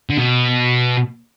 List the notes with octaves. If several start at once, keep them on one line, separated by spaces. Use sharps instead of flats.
D3
B2